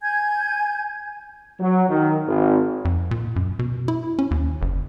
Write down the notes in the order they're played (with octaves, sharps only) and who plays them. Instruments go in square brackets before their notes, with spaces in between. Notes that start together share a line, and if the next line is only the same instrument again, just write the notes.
[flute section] G#5 G6 G#6
[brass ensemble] F#3
D#3
G#1
[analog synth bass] F2
A#2
F#2
B2
E4
C#4
D#2
F#1